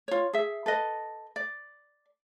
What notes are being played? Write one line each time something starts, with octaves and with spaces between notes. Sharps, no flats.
F4 C#5
G#4 E5
A4 B4 D#5
D5